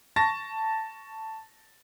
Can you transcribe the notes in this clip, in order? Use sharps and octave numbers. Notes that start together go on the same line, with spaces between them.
A5 C#6 A6 A#6